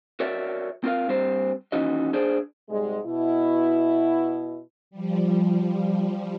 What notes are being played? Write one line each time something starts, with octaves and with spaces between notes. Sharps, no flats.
F#4 A#4 C#5 D5 E5
C4 F4 A#4 F5
G2 G3 C4 G4 C5
D#2 E3 C#4 D#4 F#4 D#5
D4 G#4 C5 D5
G#2 C3 G3 G#3
B2 E4
F3 G3